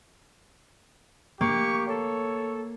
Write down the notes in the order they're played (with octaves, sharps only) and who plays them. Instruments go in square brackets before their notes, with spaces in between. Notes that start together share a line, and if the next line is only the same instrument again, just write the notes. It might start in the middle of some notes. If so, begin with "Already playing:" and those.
[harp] A#3 [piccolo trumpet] G4 [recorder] C#6
[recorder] A4 [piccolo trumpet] C#5